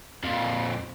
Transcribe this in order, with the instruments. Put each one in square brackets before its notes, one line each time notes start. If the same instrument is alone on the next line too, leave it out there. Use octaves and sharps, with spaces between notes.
[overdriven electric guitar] F2 A#2